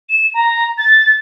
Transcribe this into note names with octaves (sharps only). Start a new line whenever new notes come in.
E7
A#5
A6